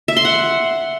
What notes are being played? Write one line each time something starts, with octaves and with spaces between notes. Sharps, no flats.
E5
C6
F#5